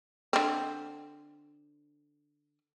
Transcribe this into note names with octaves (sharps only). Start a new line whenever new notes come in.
D3 C4